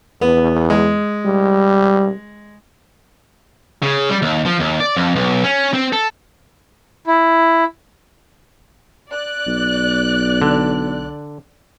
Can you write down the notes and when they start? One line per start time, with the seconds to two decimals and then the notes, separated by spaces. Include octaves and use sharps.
0.21 E2 B3
0.70 G#3
1.25 G3
3.83 C#3
4.09 G3
4.22 D#2
4.46 F3
4.60 D#2
4.80 D5
4.97 F2
5.16 B1
5.44 C#4
5.73 C4
5.93 A4
7.07 E4
9.13 D5 F#6
9.46 B1
10.42 D3